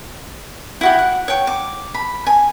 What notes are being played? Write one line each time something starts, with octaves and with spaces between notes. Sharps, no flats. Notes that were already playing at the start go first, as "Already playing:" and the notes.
E4 F#4 G4
F#5
C#5 G5
D6
B5
G#5